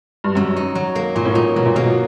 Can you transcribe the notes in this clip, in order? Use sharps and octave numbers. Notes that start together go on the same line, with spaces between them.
G2
F#2 F#3
D#4
F#3
A#3
A#2 F#3
A2
A#2 D#4
B2 F#3
A#2
B2 A#3